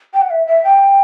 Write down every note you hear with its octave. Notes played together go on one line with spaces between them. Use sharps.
G5
F#5
E5
E5
G5